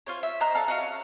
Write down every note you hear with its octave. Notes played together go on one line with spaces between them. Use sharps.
F4 C5 C#5
E5
C5 D#5 A#5 F#6
F4 A4 D5
F#4 D#5 F5
C#4